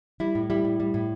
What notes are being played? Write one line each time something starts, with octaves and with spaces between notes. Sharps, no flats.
G3 E4
A2
G3 E4
A2
G3
A2